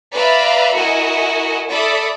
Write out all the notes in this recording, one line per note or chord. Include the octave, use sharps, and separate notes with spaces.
B4 D5 E5 F5 A#5 B5
E4 F#4 A#4 D#5 G#5
A4 D5 E5 B5 D#6